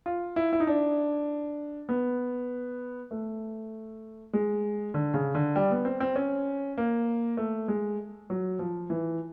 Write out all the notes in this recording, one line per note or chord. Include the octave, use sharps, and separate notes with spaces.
F4
E4
E4
D#4
D4
B3
A3
G#3
D3
C#3
D3
G3
B3
C4
C4
C#4
A#3
A3
G#3
F#3
F3
E3